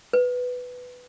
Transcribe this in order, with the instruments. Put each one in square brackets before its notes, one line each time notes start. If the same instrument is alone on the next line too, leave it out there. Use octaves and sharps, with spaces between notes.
[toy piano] B4